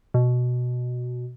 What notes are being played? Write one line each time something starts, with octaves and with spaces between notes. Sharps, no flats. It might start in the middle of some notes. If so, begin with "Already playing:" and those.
B2